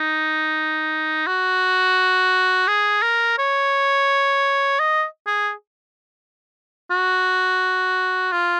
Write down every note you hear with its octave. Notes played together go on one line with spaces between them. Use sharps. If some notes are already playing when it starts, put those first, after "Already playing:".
Already playing: D#4
F#4
G#4
A#4
C#5
D#5
G#4
F#4
F4